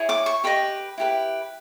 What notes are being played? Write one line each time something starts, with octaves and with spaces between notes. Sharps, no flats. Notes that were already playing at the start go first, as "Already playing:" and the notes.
Already playing: E4 G#4 C#5
D6
C#6
G4 B4 D#5 B5
E4 G4 B4